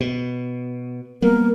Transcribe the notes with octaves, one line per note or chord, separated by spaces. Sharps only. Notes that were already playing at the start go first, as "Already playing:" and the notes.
B2
G3 A#3 B3 A#4